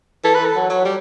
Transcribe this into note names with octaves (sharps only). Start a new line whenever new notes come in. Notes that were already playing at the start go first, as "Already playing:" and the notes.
E3 A4
B4
E3
A4
F#3
F#3
G3